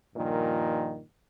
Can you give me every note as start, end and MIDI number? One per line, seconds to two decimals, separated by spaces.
0.15 1.03 43
0.15 1.03 46
0.15 1.03 51
0.15 1.03 53